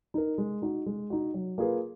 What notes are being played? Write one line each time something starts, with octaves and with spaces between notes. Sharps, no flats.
D#4 A#4
G#3
D#4 F#4
G#3
D#4 F#4
F#3
A#3 F4 G#4 B4